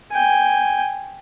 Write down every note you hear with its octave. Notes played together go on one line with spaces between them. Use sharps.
G5 G#5